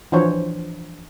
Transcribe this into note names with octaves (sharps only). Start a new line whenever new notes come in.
E3 F3 D4 C5 C#5